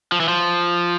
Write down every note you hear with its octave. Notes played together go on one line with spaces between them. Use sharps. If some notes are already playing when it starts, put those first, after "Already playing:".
F3
E3
F3